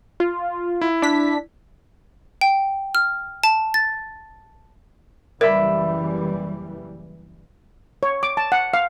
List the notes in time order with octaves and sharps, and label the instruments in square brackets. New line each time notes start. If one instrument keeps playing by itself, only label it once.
[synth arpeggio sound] F4
[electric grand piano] E4
[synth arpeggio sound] D4 B6
[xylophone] G5
F6
A5
A6
[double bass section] F#1 E3 G3 [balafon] A#4 [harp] D5 E5 B5
[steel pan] C#5
D6
A5
F#5
F5